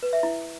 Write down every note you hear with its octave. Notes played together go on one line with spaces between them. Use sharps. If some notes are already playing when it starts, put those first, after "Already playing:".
B4
E5
E4